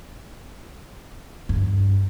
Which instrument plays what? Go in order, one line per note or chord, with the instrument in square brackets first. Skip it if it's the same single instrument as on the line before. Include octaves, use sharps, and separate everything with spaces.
[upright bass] G2